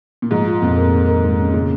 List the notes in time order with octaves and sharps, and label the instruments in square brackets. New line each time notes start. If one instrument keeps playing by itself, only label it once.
[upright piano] A#2
[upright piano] G#2 [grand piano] F3
[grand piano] F4
[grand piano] F2 [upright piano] A#2
[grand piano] A#3
D#3
A#4
G#2
C#4
[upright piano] A#2 [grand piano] C#3